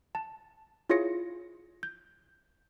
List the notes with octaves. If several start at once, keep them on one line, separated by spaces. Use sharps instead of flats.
A5
E4 F4 G#4 C#5 A#6 C#7
G6